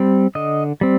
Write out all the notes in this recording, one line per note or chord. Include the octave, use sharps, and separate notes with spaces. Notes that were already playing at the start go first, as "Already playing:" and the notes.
Already playing: G3 C4
D3 D#5
G3 C4